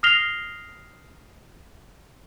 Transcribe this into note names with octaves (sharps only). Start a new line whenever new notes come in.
D#6 F6 A#6 C7 F7 G7